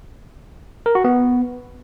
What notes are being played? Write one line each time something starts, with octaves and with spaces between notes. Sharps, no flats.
A#4
F#4
B3